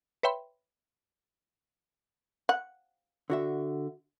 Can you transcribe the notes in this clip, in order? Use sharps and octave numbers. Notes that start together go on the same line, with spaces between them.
B4 C#5 E5 G5 B5 C6
F#5
D3 F#4 E5